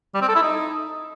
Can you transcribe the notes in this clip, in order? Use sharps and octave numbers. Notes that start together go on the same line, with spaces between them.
G3
C4
A4
E4
D#4